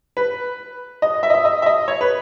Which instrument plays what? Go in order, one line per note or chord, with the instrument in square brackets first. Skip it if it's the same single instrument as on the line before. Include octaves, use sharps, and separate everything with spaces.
[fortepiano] B4
D#5
E5
D#5
E5
D#5
E5
D#5
C#5
B4